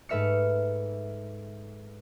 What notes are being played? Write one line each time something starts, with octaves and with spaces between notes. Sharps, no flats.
G#2 A3 B4 E5 F6 C#7